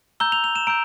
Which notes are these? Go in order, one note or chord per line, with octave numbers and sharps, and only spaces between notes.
A#5 E6 G6 G7
F7
F7
E7
A#5 E6 G6 D7